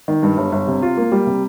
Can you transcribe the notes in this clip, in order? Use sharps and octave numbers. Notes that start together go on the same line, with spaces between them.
D#3
G2
G1
G1
C3
F4
A#3
G3
C3